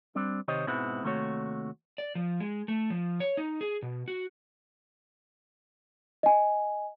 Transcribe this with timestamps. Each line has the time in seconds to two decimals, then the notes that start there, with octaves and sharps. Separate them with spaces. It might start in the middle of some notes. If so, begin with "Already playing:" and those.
0.15 G3 C4 D4
0.48 C3 D#3 G4 C5 C#5 D#5
0.67 G#2 B2 G#3 B3 C4 E4
1.03 D#2 C3 A3 F#4 C#5
1.98 D5
2.15 F3
2.40 G#3
2.68 A3
2.90 F3
3.20 C#5
3.37 D#4
3.61 G#4
3.82 B2
4.08 F#4
6.23 D#5 G#5